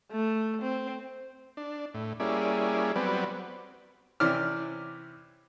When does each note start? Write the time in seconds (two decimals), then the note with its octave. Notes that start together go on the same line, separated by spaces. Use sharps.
0.11 A3
0.62 C4
1.57 D4
1.94 A2
2.20 G3 A#3 C#4 E4 G#4 D5
2.96 F#3 G3 B3 C4 B4 D5
4.20 C3 E3 C#4 D5 F6